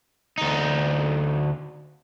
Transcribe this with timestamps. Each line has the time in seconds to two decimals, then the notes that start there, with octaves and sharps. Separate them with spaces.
0.38 D2 D#4